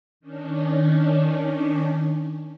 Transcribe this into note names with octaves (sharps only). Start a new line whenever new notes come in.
D#3 C#4 D4